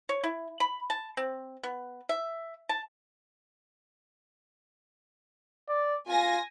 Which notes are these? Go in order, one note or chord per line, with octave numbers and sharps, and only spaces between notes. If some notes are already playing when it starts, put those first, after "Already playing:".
C#5
E4
B5
A5
C4
B3
E5
A5
D5
F4 G#5 A#6